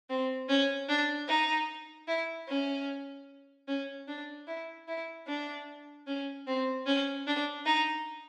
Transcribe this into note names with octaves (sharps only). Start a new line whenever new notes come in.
C4
C#4
D4
D#4
E4
C#4
C#4
D4
E4
E4
D4
C#4
C4
C#4
D4
D#4